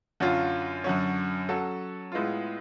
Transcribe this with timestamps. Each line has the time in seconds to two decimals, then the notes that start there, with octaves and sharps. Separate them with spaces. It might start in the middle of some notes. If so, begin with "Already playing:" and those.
0.20 F#2 D3 F#3 C#4 F4
0.84 F#2 D3 F#3 C#4
1.49 F#3 C#4 F#4 A4
2.12 A2 G#3 B3 F4